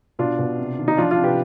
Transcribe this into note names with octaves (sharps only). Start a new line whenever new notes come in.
B2 D4 F4
B2
C3
D#3
D#4
F3 D4 F4
D4 F4
C3
G4 B4